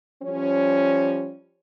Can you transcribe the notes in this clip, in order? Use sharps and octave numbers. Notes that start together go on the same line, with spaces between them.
F3 G3 C#4